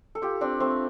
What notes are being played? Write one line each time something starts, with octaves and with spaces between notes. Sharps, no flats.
A4
F4 G4
C4 D4 D5
A3 C4 C5